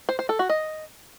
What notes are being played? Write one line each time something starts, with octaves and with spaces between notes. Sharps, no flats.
C5
C5
A4
F#4
D#5